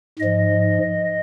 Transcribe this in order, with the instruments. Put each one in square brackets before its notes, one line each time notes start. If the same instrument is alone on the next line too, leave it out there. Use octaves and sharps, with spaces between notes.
[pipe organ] G#2 F3 D#5